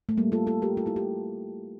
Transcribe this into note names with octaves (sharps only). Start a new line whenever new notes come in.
A3
G3 A#3
F4 A4
F4 A4
G4 A#4
F4 A4
E4 G4
E4 G4